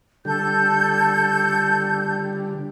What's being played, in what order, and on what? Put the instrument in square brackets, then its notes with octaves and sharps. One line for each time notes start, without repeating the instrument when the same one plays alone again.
[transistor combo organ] D3 G3 [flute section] A4 G6